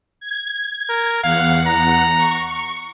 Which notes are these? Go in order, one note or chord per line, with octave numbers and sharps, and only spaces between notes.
G#6
A#4
E2 F5 F#5
A#5
C#6